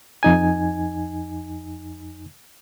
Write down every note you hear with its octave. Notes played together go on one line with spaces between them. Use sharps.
F2 D#4 G#5